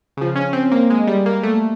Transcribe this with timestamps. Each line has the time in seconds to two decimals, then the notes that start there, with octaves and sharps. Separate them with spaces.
0.17 C#3 F3
0.36 C#4
0.53 C4
0.71 A#3
0.90 G#3
1.07 G3
1.26 A#3
1.43 A3